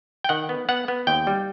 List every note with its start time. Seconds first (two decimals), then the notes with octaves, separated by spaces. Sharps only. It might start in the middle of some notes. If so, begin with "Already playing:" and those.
0.24 G5
0.29 D#3 F#5
0.49 B3
0.69 B3 F#5
0.88 B3
1.07 D#2 G5
1.27 G3